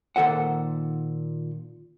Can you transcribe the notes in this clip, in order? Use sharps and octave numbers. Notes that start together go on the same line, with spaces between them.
A#2 D#3 A4 C5 F#5